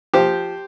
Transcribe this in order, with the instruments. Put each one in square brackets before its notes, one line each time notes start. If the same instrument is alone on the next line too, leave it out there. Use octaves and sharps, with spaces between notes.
[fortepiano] F3 G4 C5